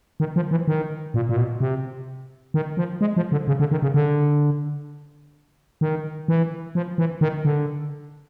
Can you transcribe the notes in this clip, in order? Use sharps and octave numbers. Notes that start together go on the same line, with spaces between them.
D#3
F3
E3
D#3
A#2
A#2
B2
C3
D#3
F3
G#3
F3
D3
C#3
D3
D#3
C#3
D3
D#3
E3
F3
E3
D#3
D3